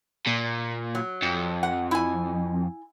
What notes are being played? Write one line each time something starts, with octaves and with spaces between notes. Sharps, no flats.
A#2
F#3
F2
F#5
E4 G#5